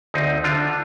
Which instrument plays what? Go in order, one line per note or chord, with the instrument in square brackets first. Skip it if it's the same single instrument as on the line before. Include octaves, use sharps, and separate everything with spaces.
[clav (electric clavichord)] D2 C4 D#4
D3 D4 F4